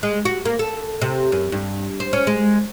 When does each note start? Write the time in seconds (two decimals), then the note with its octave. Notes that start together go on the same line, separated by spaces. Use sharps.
0.03 G#3
0.25 F#4
0.45 A#3
0.59 A4
1.02 C3
1.32 F#2
1.52 G2
2.00 C5
2.13 C#4
2.27 G#3